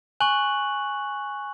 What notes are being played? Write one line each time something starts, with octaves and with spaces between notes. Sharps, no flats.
G#5 C#6 F#6 F#7